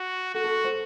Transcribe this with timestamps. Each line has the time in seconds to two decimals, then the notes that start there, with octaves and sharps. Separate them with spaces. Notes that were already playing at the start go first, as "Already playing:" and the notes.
Already playing: F#4
0.34 F#4 A4
0.44 A4
0.64 C5